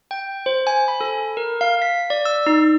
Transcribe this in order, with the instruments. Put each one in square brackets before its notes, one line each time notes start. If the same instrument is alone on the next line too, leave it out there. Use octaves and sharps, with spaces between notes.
[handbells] G5
C5
G#5
B5
A4
A#4
F5
B6
D5
E6
D#4